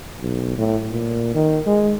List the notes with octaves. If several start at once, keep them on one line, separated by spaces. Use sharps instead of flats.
B1
A2
A#2
D#3
G#3